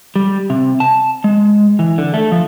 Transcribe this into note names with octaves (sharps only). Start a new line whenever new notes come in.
G3
C3
A5
G#3
E3
D3
A3
F3